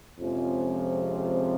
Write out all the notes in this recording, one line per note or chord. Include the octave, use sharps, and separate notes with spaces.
F2 C3 F3 G#3 C#4